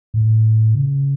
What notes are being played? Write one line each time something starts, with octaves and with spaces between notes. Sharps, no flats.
A2
C#3